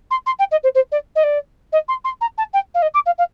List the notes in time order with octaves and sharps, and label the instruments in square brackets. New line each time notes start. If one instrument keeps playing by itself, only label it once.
[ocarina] C6
C6
G5
D#5
C5
C5
D5
D#5
D5
D#5
C6
C6
A#5
A5
G5
F5
D#5
D6
F5
F5